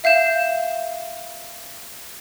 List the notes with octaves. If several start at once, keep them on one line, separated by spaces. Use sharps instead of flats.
E5 F5 G6 E7